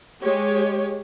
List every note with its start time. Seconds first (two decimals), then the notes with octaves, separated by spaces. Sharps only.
0.21 G#3 G4 C#5